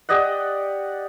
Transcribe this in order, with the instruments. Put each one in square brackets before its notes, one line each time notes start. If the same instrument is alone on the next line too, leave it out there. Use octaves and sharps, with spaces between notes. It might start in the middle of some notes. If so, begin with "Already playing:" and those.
[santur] G4 D5 D#5 F#5